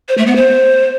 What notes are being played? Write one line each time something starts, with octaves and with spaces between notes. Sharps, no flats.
C5
A3
B3
C5